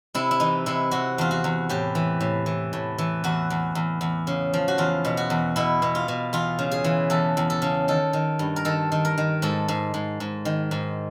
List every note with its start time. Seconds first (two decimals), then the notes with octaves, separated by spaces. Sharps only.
0.15 C3 E4
0.31 E4
0.40 E3 D#4
0.66 C3 E4
0.91 C3 F#4
1.18 E2 F4
1.31 F#4
1.44 E2
1.69 A2 G4
1.95 E3
2.20 A2
2.46 E3
2.73 A2
2.98 E3
3.24 E2 F#4
3.50 E2
3.75 E2
4.01 E2
4.27 C#3
4.54 F3
4.68 F#4
4.78 E2 F4
5.05 B2
5.17 F#4
5.30 E2
5.56 B2 E4
5.82 B2
5.95 F4
6.08 B2
6.33 E2 F4
6.59 C#3
6.71 G#4
6.84 E3
7.10 E2 A4
7.37 E2
7.50 A4
7.62 C#3
7.88 D#3 A4
8.13 D#3
8.39 G2
8.56 A#4
8.65 D#3 A4
8.92 D#3
9.05 A#4
9.18 D#3
9.42 G#2 A4
9.68 G#2
9.94 G#2
10.20 G#2
10.45 D#3
10.71 G#2